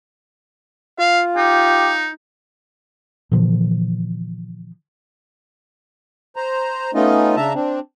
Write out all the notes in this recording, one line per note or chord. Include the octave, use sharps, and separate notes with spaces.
F4 F5
D#4 G4
A#2 D3 E3 F3
C5 A#5
A3 B3 C#4 D#4 F4 D#5
C#3 D4 E5 A5 A#5
C4 D4